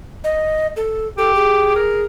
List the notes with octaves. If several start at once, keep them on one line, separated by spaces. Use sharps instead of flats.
D#5
A4
G4 A4
G#4
A#4